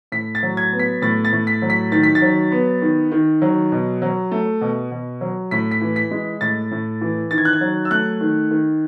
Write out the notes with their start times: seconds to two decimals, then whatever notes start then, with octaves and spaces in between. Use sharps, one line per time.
0.12 A2 B6
0.35 A6
0.43 F#3
0.57 G#6
0.72 B3
0.79 B6
1.02 A2 A6
1.25 A6
1.33 A2
1.47 B6
1.62 F#3
1.70 B6
1.92 D#3 A6
2.03 B6
2.15 A6
2.22 F#3
2.52 B3
2.82 D#3
3.12 D#3
3.42 F#3
3.72 B2
4.02 F#3
4.32 A3
4.61 B2
4.91 B2
5.21 F#3
5.51 A2 B6
5.71 B6
5.81 E3
5.96 B6
6.11 G#3
6.41 A2 A6
6.71 A2
7.01 E3
7.31 D#3 A6
7.38 G#6
7.45 F#6
7.53 G#6
7.61 F#3
7.85 E6
7.91 A3 F#6
8.21 D#3
8.51 D#3